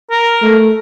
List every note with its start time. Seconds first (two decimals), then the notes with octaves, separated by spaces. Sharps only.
0.11 A#4
0.42 A3